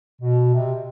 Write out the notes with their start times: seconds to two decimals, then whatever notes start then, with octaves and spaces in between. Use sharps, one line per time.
0.21 B2
0.54 C3